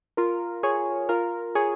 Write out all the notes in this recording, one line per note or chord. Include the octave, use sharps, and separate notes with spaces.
F4 A#4
G#4 C#5
F4 A#4
G#4 C#5